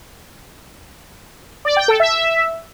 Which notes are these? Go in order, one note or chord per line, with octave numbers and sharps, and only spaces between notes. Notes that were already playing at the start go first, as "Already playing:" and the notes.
D5
G5
A4
E5